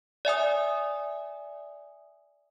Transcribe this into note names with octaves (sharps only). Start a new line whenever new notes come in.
D5 E5 G#5 D#6